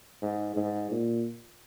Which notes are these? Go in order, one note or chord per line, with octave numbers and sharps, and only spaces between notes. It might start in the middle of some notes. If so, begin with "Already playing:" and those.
G#2
G#2
A#2